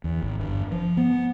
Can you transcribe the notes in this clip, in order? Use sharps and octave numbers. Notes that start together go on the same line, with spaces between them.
E2
G#1
G1
F3
B3